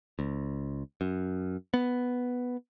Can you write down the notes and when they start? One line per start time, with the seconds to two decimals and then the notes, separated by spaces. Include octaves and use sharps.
0.19 C#2
1.01 F#2
1.74 B3